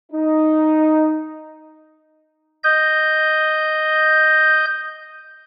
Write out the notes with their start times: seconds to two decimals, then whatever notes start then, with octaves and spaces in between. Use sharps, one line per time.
0.13 D#4
2.64 D#5 G6